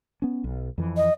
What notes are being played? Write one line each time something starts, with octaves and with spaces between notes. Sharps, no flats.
B3 C#4
B1
F2 E3
D#5